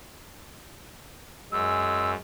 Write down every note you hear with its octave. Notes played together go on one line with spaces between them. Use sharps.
F#2 G#3 E6